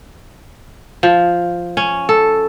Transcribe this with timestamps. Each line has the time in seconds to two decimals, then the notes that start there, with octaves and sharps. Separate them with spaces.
1.03 F3
1.77 C#4
2.09 A4